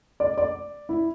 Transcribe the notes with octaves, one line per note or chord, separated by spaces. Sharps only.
D5
D5
E4